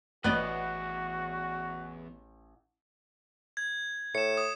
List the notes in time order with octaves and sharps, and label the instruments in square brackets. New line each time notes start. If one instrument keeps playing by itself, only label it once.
[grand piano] A1 F#6 [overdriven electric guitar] E2 [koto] B3 D5 D#5 [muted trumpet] F#4
[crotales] G#6
[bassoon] A2 [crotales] C#7 E7
[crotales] D#6